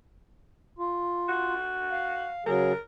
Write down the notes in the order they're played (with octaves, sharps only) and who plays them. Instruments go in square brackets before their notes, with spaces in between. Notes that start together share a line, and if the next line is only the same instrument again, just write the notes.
[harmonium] F4
[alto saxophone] F#4
[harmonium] F5
[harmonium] C#3 F#3 G#4 [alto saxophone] A#4